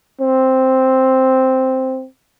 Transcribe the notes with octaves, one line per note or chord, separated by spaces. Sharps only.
C4